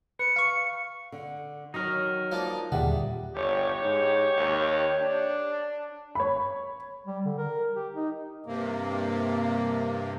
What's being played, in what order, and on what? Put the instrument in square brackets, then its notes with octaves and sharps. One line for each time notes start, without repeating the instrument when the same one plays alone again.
[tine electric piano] B4 [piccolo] C#7
[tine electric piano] F5 C#6
[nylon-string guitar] D3
[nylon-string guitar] F#3 C#5 [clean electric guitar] D#4 A#4
[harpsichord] F3 A#3 D4
[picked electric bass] D#2 A#2 D3 [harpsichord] G3 [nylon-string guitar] G#4 E5 F#5
[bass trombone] G1 [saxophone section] G4 C#5
[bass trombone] G#2
D#2
D4
[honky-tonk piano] C#5 B5
[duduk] G3
D3
A#4
G4
D#4
[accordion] G2 C3 A#3